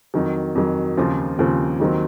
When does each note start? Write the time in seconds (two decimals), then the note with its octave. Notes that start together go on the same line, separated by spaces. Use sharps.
0.14 F2 D#3 F#3
0.55 F2 D#3 F#3
0.97 D#2 C#3 F3 C4 F4
1.39 D#2 C#3 F3 C4 F4
1.80 D#2 D#3 F#3 C4